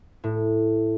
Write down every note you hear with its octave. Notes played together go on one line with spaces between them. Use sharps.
A2